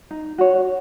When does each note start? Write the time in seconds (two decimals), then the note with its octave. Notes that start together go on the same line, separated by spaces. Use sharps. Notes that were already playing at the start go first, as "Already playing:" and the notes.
0.11 D#4
0.38 F#4 C#5